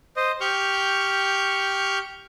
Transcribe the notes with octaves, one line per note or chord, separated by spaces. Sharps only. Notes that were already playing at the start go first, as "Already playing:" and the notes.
C5 D#5
G4 C#6 F6 G6